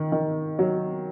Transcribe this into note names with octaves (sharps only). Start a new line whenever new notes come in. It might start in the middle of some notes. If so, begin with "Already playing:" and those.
Already playing: D#3
D#3
F#3